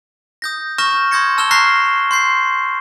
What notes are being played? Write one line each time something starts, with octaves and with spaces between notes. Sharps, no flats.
D#6 G6 A#6
C#6 F6 G6 A#6 E7 G7
C6 D#6 G6 G#6 A#6 C#7
A5 E6 F6 G6 E7 G7
A#5 C#6 F6 F#6 A#6 C7
C6 G6 C7